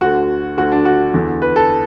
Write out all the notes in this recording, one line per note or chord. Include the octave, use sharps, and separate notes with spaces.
D2 D3 F#4
D2 D3 F#4
D4
F#4
E2 D3
B4
A4